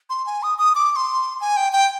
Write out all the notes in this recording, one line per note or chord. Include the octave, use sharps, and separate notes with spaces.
C6
G#5
D#6
D#6
D6
D6
C6
G#5
G5
G5